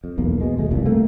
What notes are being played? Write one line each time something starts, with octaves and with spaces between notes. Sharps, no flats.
F2
B1 E2 A#3
B2 G#3
D1 D#2 G#3 A3
F#1 C2 G2 A#2
A3 A#3 C4